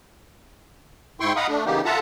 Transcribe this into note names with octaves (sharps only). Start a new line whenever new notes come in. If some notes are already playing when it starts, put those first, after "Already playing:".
G#2 E4 G5 C6 C#6
D#5 F5 F#5 A#5 B5 D#6
A3 D4
C#3 E3 A#3 B3 D#4 G4
F4 A4 E5 F#5 A5 A#5